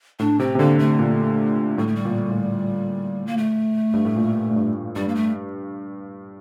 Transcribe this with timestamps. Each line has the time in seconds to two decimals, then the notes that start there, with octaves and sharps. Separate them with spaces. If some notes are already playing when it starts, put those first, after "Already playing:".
0.19 A2 D4
0.39 C3 C4
0.55 C3
0.59 D3 A#3
0.79 C3 A3
0.99 A#2
1.78 A2 G3
1.87 A3
1.96 G3
2.05 A#2
2.31 A2
3.27 A#3
3.37 A3
3.93 G2
4.05 A2
4.16 A#2
4.51 A2
4.56 G2
4.96 G2 G3
5.08 A#3
5.15 A3